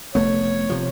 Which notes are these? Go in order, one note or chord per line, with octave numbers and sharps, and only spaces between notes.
F1 A3 B3 C#5
C3 F3